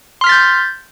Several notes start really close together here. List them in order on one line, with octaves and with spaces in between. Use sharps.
C6 F6 B6 A6 G6